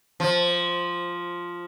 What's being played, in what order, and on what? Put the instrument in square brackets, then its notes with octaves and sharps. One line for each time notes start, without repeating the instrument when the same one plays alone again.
[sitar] F3